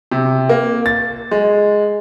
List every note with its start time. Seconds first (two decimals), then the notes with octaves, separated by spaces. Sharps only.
0.12 C3
0.49 A#3
0.86 A6
1.31 G#3